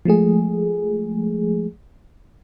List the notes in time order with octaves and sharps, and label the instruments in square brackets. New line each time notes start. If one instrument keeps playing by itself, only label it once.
[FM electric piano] F3 G#3 A3 G#4